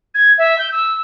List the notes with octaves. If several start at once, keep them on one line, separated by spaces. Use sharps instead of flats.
G#6
E5
G6
E6